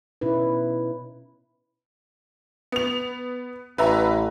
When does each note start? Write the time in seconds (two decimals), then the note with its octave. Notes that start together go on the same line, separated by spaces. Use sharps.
0.21 B2 C#4 D#4 E4 B4
2.72 B3 F7
3.78 A1 B4 E5 A#5